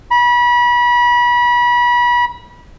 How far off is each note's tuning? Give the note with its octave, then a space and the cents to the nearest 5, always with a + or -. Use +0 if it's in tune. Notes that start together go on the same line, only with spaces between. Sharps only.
B5 -30